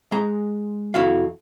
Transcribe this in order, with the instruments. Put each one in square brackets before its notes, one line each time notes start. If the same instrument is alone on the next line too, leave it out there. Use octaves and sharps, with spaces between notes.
[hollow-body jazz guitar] G#3 A#5
F2 E4 F#4 F5